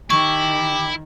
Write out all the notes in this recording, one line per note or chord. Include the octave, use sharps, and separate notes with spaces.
D#3 E4 G4 C#6